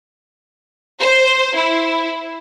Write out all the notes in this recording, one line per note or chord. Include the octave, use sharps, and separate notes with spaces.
C5
E4